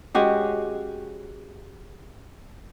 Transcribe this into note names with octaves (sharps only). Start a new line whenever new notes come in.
G#3 C#4 F#4 G4